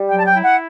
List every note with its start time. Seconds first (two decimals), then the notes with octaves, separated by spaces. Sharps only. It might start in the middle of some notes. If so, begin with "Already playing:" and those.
Already playing: G3
0.09 F#3 G5
0.19 A5
0.26 G5
0.35 E4
0.44 F#5